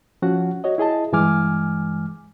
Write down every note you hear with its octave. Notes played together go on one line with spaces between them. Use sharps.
F3 C#4 F#4 F#5
F#4 C#5 D#5
E4 G#4 D#5 A5
G2 E3 G#3 G#5 D6 F6